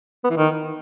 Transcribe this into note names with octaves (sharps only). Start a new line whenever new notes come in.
B3
E3
D#3